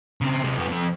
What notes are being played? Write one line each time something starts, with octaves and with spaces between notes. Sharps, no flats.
C#3 C4
C3 G#3
F2 B3
F2 C4